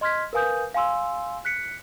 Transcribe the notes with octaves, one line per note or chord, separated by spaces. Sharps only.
D#5 C6 F6 G#6 B6
A#4 B4 F5 G#5 D#6 G6
F5 G#5 C6 E6
F#6 B6 C#7